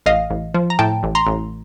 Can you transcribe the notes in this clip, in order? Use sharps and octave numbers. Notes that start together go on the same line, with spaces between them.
A1 D#5 F5
A1
F3
A#5
A2 G5 A5
A1
A#5 C6
A1